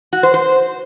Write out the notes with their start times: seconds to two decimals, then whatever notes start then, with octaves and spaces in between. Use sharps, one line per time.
0.13 F#4
0.23 C5
0.34 C5